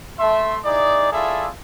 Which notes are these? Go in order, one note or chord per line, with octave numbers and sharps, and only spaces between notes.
A3 E5 C6
D#4 E4 G#4 D5
E4 F4 G#4 A4 D5 E5